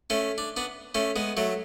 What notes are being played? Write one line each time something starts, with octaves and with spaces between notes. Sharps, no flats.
A3 C#4
D4
B3 D4
A3 C#4
G#3 B3
F#3 A3